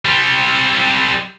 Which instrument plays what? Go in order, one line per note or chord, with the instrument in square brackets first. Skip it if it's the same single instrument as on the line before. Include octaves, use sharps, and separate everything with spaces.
[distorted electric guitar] G3 C4